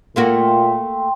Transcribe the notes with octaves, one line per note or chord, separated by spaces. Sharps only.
A#2 A3 A#3 F#4 G5 C6